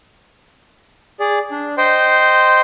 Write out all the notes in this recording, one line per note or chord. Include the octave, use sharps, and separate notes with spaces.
G#4 D5
D4
C5 D#5 G5 C6